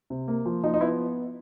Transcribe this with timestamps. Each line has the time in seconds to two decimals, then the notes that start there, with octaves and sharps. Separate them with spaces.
0.10 C3
0.28 A#3
0.46 F3
0.64 F3 D#4
0.74 D#4
0.81 B3 E4